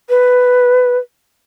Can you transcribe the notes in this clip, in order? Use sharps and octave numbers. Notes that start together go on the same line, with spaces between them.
B4